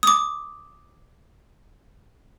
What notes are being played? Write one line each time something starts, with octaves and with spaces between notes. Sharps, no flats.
D6 D#6